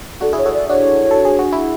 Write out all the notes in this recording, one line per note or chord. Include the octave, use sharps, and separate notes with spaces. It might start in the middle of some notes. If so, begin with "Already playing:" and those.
D4 F#4 A4
E4 G#4
C#5
F#4 A4
D5
D4 F#4 C#5
A4
G#4
F#4
E4